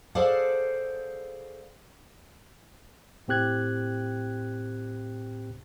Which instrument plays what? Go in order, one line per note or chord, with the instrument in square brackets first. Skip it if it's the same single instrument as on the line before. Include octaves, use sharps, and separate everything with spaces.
[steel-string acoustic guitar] G#4 A4 C5 D5 F5 F#5
[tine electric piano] A2 C4 G4 F#6 G#6